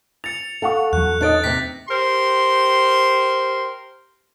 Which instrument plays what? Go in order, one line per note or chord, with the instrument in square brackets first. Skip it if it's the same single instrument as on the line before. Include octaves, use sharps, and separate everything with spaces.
[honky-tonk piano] A6 [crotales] C#7 F7
[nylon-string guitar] A4 [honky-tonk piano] F5 F#5 C#6
[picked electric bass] E2 F#3 [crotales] F#6
[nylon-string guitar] D4 C#5 D#5 [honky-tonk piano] D#4 D7 [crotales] F#6 A6
[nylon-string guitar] C3 C4 [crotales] A#6 B6
[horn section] G4 A#4 C5 C6